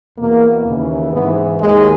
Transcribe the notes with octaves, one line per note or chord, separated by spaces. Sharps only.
E2 B2 A#3
D#2 C#3 E3
G#2 E3 B3
D#2 D#3 G#3